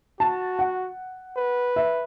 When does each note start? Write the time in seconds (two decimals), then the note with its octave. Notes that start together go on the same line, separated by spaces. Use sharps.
0.20 F#4 A5
0.59 F#5
1.37 B4
1.76 E5